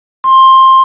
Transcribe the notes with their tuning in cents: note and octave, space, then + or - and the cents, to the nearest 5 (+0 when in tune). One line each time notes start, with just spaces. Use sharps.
C6 +15